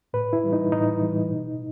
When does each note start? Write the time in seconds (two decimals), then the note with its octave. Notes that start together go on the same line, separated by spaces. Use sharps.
0.13 A2 B4
0.33 E4
0.44 E3 G3
0.53 D#4
0.72 A2 D#4
1.01 E3 G3
1.30 B2